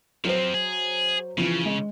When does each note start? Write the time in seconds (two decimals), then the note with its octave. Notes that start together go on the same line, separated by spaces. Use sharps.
0.24 F3 F#3 C4 C5
0.54 G#4
1.37 C#3 E3 F3
1.66 G#3